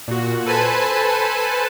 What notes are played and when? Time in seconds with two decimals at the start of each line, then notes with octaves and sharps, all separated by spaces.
0.08 A#2 F#4
0.46 A4 B4 C5 G#5 A5 B5